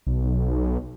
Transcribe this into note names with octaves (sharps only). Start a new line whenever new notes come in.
B1